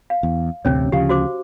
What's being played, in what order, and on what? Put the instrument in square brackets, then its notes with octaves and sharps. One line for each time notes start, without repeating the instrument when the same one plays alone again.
[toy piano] F5
[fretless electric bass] E2
[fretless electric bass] A1 D2 C3 [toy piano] C#4 C#5
[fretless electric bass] D2 C#3 F3 [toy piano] G4 F5
[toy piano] F#4 C5 D6